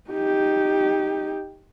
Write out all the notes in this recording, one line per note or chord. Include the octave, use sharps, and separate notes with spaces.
D#4 G4